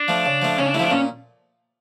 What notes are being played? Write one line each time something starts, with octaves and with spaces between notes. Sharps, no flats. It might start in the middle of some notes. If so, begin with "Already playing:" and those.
Already playing: D4
F3 A3
C#3
F3 A3
C#3 C#4
D4
A3 E4
F3 D4
A#2 C#4